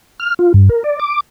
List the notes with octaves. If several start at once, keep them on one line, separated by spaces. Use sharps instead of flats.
F6
F4
G2
A#4
D5
D6